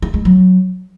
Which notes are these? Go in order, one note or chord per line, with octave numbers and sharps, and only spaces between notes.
E4
G#3
F#3